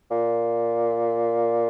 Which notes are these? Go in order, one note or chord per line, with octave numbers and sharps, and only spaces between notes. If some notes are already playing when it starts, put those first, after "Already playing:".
A#2